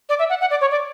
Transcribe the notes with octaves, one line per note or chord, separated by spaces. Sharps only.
D5
E5
F#5
F#5
D5
C#5
D5